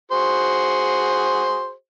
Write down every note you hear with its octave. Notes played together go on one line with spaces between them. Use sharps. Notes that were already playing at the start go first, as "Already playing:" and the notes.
F#4 G#4 C5